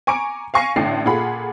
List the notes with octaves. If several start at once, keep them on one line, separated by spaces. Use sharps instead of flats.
G#5 A#5 C#6 D6 D7
F5 G#5 C#6 A#6 C7 D#7
A1 A2 D3 D4 D5 C7
A#2 F4 G#4 A4 F#5 B5